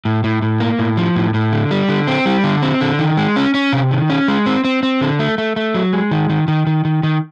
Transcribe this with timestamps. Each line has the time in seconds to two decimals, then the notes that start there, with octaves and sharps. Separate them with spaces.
0.05 A2
0.24 A2
0.42 A2
0.60 A#3
0.79 A2
0.97 F3
1.16 A2
1.34 A2
1.53 D3
1.71 G3
1.89 D3
2.07 C4
2.26 G3
2.44 D3
2.62 C4
2.81 D3
2.99 D#3
3.17 G#3
3.36 C#4
3.54 C#4
3.73 C3
3.91 D#3
4.10 C#4
4.28 G#3
4.46 C4
4.65 C4
4.83 C4
5.01 D3
5.19 A3
5.38 A3
5.56 A3
5.75 F#3
5.93 G#3
6.11 D#3
6.30 D#3
6.48 D#3
6.67 D#3
6.85 D#3
7.03 D#3